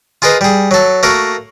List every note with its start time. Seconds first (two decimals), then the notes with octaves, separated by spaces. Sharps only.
0.22 F4 G#4 A#4 B4 D#5
0.41 G3 G#4
0.71 F#3 A4
1.03 A3 A#3 F#4 A#4